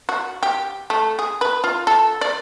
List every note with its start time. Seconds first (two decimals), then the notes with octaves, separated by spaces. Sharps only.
0.09 F#4
0.43 G4
0.90 A3
1.19 G#4
1.41 B4
1.64 F4
1.87 A4
2.21 D5